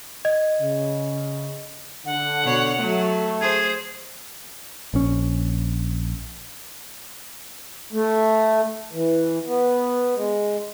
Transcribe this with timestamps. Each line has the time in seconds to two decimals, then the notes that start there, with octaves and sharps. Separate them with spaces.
0.25 D#5 G#6
0.60 C#3
2.05 D3 F#5
2.42 B2 C#5
2.79 F#3 A3
3.41 G#4 C5 G#6
4.94 A#1 C#4
7.93 A3
8.93 E3
9.46 B3
10.16 G#3